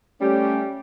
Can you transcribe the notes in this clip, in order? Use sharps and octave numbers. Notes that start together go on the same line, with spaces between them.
G3 A3 C#4 G4